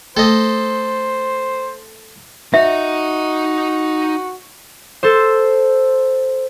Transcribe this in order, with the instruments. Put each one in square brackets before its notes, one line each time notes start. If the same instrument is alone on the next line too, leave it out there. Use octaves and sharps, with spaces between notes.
[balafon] A3 [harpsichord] A4 D#5 [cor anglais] C5
[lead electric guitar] D#4 D#5 [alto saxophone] F#4 [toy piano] E5
[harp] A4 C5